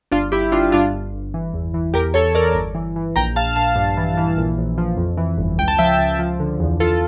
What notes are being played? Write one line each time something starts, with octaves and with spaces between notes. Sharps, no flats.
G1 D4 F4
G1 E4 G4
G1 D4 F4
G2 D4 F4
G1
G1
E3
E2
E3
E2 G4 A#4
E2 A4 C#5
E2 A#4 D5
G1
E3
E3
A#1 G5 A#5
A#1 F5 A5
A#1 F5 A5
G2
E3
E3
A#1
A#1
F3
F2
E3
G1
C#2 G5
A5
F3 E5 G5
C#2
F3
D3
E2
E2 F4 A4